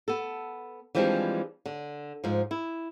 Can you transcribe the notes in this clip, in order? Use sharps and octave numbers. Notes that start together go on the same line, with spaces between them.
B3 A4
E3 F3 G3 G#3 C4 D4
D3
G#2 F3
E4